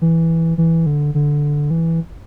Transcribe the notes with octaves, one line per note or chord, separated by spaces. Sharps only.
E3
E3
D3
D3
E3